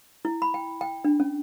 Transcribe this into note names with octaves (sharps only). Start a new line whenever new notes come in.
E4
B5
G5
G5
D4
C#4